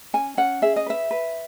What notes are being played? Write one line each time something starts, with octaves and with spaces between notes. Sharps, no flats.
C#4 G#5
C#4 F#5
G#4 E5
D#5
B4 E5
B4